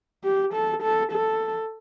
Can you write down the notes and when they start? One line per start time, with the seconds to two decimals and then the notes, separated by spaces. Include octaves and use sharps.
0.24 G4
0.54 A4
0.82 A4
1.12 A4